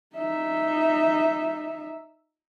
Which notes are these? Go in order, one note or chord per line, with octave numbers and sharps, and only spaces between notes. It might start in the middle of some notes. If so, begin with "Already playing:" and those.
D#4 E5